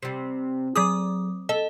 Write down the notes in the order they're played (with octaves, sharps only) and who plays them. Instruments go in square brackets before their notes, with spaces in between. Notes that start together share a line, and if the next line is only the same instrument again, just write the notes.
[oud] C3 G3
[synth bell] F#3 D6 D#6 [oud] G#4
[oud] A4 [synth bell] D#5